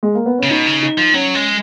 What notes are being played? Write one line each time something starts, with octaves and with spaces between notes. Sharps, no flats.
G#3
A#3
B3
C#3 C#4
B2 D#4
C#3
D#4
F3
F#3 C#4
G#3